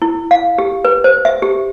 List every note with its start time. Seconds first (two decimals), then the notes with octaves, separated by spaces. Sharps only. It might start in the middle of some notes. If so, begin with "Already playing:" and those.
0.02 E4
0.31 F5
0.58 G4
0.85 B4
1.04 C5
1.25 E5
1.42 G4